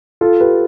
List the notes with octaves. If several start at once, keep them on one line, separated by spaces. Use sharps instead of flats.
F4 A4
G4 B4